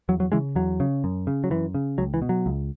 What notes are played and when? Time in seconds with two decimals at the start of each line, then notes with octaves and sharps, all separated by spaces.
0.09 E2 F#3
0.20 F#3
0.32 C#3 E3 G#3
0.55 E2 F#3
0.80 C#3
1.04 F#2
1.27 C#3
1.44 F#3
1.50 F#2 E3
1.75 C#3
1.98 C#2 F#3
2.14 E3
2.22 B2
2.29 F#3
2.46 C#2